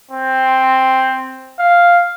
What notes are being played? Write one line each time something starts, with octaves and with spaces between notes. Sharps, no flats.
C4
F5